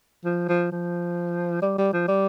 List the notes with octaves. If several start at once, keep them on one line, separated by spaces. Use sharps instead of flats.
F3
F3
F3
G3
G3
F3
G3